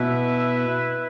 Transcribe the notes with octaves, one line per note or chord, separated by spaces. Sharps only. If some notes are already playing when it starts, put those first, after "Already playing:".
Already playing: B2 E4 B4 E5